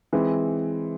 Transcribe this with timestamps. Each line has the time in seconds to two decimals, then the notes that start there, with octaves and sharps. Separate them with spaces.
0.13 E3 G#3 C4 E4